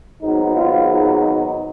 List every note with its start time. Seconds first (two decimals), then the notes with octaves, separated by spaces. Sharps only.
0.22 G#1 G#2 F#3 B3 D#4
0.55 F4
0.88 D#4